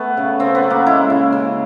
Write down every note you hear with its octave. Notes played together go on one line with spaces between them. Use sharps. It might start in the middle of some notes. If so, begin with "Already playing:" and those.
Already playing: A3 B3
C#3
C#3 C4
B3
F#3
A#3
G#3 E4
C#3
C#3